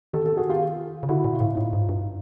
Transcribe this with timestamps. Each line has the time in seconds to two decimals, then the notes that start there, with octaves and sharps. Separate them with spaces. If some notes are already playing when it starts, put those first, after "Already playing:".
0.13 D#3 G4 A4
0.25 G4 A4
0.37 F#4 G#4
0.49 F4 G4
1.03 C#3
1.09 D3 E4 F#4
1.24 A#2
1.33 F4
1.40 A2 E4
1.55 A2 D#4 F4
1.73 G#2
1.89 G2